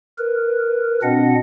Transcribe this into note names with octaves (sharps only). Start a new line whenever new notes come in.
A#4 B4
B2 C4 D4 D#5 F#5